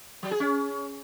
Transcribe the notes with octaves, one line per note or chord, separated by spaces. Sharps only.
F#3
G#4
C#4